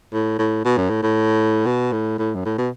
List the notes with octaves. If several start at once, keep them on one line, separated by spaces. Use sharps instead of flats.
A2
A2
B2
F#2
A2
A2
B2
A2
A2
F#2
A2
B2